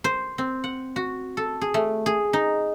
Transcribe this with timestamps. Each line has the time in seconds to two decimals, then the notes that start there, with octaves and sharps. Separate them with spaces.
0.04 C5
0.38 C4
0.64 F#5
0.96 F#4
1.37 A4
1.61 G#4
1.74 A3
2.06 G#4
2.33 D#4